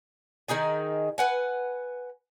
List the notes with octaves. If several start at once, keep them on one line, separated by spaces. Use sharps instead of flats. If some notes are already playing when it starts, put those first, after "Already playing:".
D#3 D#4 G#4 G#5
B4 F#5 G#5